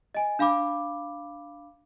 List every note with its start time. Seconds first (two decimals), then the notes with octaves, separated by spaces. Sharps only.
0.15 D#5 G#5
0.39 D4 F5 B5 D6